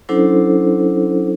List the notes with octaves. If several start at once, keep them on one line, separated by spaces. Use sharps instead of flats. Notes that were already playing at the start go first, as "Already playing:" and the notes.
F#3 C#4 D4 E4 A4 C5